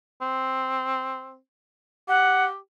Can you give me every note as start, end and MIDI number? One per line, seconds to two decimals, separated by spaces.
0.22 1.37 60
2.08 2.57 67
2.08 2.45 78